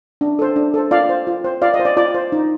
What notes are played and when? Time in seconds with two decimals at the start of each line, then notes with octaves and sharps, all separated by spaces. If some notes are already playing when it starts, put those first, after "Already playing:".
0.21 D4
0.39 A4 C5
0.56 D4
0.74 A4 C5
0.91 F4 D5 F5
1.09 C5
1.27 F4
1.44 C5
1.62 F4 D5 F5
1.74 D#5
1.79 C5
1.85 D5
1.97 F4 D5
2.14 C5
2.32 D#4